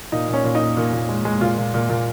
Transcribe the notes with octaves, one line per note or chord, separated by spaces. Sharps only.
A#2 D#4
A#2
C#4
A#2
D#4
A#2
A#2
A#2
G#3
G#3
A#2 F4
A#2
A#2
A#2